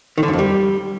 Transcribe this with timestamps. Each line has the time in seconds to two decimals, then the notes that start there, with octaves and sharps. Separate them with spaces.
0.18 D#3
0.23 D3
0.28 F#2
0.33 F2
0.39 G3